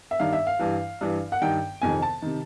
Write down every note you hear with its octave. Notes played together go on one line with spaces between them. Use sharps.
E5
G2 D#3 F5
E5
F5
G2 E3
G2 E3
F#5
G2 D#3 G5
F2 C3 D#3 G#5
A5
C3 D#3